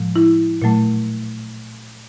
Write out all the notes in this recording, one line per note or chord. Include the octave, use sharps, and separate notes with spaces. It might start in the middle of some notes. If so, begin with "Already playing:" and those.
Already playing: A2 F3 G#3
E4
A#2 F#3 A3